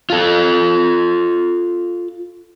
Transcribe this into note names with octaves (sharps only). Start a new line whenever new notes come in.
F4 A4